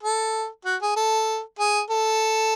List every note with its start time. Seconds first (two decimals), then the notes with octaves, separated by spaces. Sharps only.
0.03 A4
0.65 F#4
0.82 G#4
0.96 A4
1.59 G#4
1.90 A4